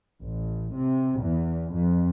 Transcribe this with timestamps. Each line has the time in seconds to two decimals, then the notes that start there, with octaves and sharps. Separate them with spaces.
0.20 A1
0.75 C3
1.20 E2
1.74 F2